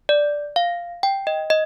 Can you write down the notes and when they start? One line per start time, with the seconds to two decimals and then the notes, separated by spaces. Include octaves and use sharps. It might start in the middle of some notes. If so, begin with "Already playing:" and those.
0.09 D5
0.56 F5
1.03 G5
1.27 D#5
1.50 D#5